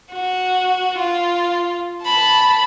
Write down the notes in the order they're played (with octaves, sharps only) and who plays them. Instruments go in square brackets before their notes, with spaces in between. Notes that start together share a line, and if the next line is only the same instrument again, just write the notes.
[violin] F#4
F4
A5 B5